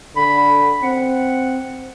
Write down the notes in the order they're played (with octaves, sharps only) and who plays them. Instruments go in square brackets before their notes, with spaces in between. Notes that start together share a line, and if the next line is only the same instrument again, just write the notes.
[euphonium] D3 [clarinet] B5
[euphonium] C4 [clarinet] F#5